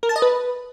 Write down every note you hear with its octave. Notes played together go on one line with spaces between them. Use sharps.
A#4
A5
D#5
B4